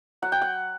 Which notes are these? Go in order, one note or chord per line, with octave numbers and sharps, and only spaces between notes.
F#3 F#5
G5
F#5